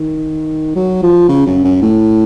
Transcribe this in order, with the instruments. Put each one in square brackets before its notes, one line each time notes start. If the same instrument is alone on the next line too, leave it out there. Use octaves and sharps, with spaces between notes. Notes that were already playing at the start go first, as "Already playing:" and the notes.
Already playing: [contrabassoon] D#3
F#3
F3
C#3
F#2
F#2
A2